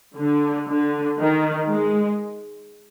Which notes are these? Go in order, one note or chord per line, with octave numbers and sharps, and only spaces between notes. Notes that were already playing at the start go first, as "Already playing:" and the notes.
D3
D3
D#3
G#3